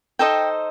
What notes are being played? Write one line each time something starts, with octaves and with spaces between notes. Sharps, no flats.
D#4 A4 C5 D#5 G5